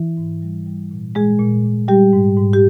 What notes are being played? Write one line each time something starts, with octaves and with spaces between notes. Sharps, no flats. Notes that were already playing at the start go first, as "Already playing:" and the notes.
Already playing: E3 E4
G#2
G3
G3
A#2
A#2 G#3 G#4
A#2
A#2
G3 G4
G#2
G#2
G4